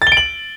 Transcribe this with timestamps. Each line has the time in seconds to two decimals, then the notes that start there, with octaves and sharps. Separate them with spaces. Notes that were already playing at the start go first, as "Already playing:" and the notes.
0.02 A6
0.07 G7
0.12 D7
0.17 F#7